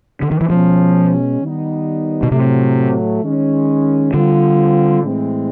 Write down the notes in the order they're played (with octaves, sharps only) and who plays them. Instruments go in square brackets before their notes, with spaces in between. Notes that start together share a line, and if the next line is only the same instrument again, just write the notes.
[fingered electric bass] D3
D#3
E3
[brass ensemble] B2 G#3 C#4 [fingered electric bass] F3
[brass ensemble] D#3 G3 B3 D#4
[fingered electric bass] B2
[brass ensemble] A2 F#3 A3 [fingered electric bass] C3
[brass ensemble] D#3 G#3 C#4
[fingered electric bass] D3 [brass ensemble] G3 C4 F4
[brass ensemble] A2 E3 G#3 C4